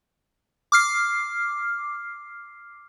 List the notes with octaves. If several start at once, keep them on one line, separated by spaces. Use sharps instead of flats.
D6 F6 C7